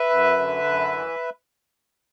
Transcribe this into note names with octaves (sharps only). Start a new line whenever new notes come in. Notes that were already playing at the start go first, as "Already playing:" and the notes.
Already playing: B4 E5
F#2
D3
F#2
E3